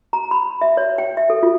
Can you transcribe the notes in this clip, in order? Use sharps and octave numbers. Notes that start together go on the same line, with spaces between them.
A#5
B5
E5
C#5
G5
E5
A4
F4